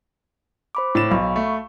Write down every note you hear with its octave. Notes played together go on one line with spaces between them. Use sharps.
C5 B5 D6
A2 A6 E7
B1 F5 B5 C#6
A3